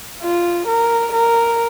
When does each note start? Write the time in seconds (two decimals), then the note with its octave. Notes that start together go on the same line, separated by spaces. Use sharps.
0.23 F4
0.68 A#4
1.13 A#4